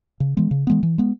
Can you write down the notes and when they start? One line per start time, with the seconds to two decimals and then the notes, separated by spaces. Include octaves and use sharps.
0.20 C#3
0.37 E3 G#3 B3
0.51 C#3
0.67 E3 G#3 B3
0.83 E3
0.98 G#3 B3